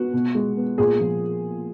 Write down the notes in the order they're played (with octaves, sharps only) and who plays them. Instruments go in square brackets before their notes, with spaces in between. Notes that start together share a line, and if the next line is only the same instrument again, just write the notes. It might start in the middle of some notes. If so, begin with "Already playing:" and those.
Already playing: [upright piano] B3 F#4
B2
G#3
B3
A#2 G#4
F3